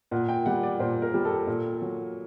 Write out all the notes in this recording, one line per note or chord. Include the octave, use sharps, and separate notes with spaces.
A#2 F#5
G5
G3 F#5
D5
A#2 C5
A#4
G3
A4
A#2
F#3